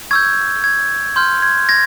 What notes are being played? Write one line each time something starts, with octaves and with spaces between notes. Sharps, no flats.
C#6 E6 G6 G#6
G#6
C6 F6 G6
G#6
G#6 A#6